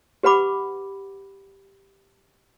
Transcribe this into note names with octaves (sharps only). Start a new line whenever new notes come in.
G4 B4 F#5 B5 D6